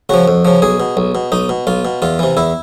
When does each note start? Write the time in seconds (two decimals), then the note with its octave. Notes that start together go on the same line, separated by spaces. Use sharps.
0.09 C#3 F3 F#4
0.28 F2
0.45 C#3 F3
0.62 B1 G#4
0.80 B2
0.97 B1
1.15 B2
1.32 B1 D#4
1.49 B2
1.67 B1 F4
1.85 B2
2.02 E2 F4
2.19 C3 E3
2.37 E2 E4